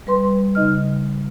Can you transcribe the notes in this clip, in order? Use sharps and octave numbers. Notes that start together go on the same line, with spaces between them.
G3 B4 C6
C#3 D#4 D#5 F6